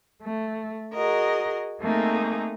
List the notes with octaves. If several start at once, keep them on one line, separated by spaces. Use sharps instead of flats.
A3
F#4 G#4 A#4 D#5
A3 A#3 C4 D#4 G#4